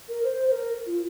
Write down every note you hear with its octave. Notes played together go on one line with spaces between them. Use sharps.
A#4
C5
C5
A#4
F4